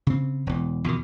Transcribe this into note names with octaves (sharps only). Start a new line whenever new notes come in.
C#3 C4
E1 E2
E2 B2 D#3